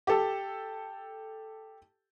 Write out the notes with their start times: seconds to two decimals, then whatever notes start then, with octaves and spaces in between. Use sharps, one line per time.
0.07 G4 A4